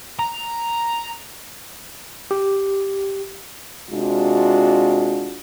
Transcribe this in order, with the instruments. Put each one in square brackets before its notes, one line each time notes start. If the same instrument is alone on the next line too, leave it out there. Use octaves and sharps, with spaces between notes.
[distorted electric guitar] A#5
[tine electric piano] G4
[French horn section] C3 G#3 D4 F4 F#4